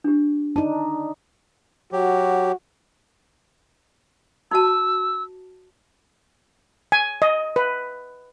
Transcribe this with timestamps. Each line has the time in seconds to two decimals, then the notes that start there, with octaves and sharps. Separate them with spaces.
0.04 D4 G4
0.56 D4 D#4 A5
1.92 F#3 F#4 G4
4.51 D#4 F#4 A5 E6
6.92 G#5
7.22 D#5
7.56 B4